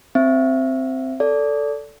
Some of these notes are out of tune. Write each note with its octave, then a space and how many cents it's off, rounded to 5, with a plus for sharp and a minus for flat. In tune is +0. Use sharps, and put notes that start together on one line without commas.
C4 +0 E5 +20
A4 +5 D5 -20